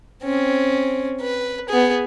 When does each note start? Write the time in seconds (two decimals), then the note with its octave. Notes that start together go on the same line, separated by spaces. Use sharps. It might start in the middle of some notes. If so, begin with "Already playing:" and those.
0.23 C4 C#4
1.21 B4
1.69 B3 G#4